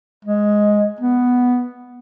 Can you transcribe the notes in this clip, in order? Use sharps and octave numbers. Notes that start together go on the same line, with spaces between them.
G#3
B3